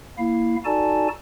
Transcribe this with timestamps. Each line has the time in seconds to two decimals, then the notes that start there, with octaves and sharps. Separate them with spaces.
0.18 A#3 E4 F5
0.65 D#4 F#4 A4 D5 G#5 A5